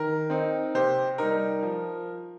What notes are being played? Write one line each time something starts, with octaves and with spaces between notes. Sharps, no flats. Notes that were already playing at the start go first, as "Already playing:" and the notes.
Already playing: D#3 A#4
C4 D#4
C3 G4 C5
G3 D#4 A#4
F3